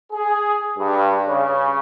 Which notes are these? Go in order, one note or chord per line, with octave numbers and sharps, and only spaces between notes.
G#4
G2
C#3